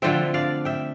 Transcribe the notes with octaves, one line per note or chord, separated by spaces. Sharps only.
D3 F3 A3 C4 E5 G5
D5 F5
E5 G5